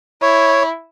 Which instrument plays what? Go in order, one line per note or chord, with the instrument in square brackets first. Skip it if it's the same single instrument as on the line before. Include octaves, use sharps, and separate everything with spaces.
[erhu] E4 [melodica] C#5